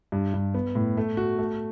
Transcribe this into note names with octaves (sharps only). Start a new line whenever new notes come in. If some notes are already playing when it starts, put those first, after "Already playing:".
G2
G2
B3
A2
A3
F#4
A3